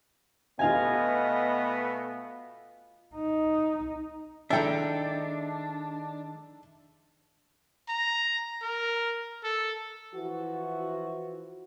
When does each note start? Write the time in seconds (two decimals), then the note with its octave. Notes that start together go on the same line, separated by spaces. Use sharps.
0.59 B2 A3 B3 F4 D#5 F5 G#5
3.16 D#4
4.50 D#3 G#3 D4 E4 A4 E5 G5 A#5
7.89 A#5
8.62 A#4
9.44 A4
10.14 E3 F3 E4 F#4